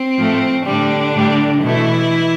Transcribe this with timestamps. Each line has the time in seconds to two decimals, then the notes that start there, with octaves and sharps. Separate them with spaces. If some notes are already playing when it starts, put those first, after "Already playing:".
Already playing: C4
0.17 A2 F3 A3
0.65 A2 D3 G3 D4
1.15 A2 G3
1.62 B2 E3 A3 E4